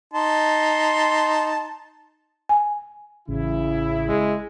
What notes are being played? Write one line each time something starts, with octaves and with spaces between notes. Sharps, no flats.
D#4 A5 C6
G#5
A1 C#3 E4
G#3